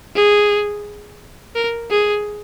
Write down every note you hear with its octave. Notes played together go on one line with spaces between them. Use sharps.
G#4
A#4
G#4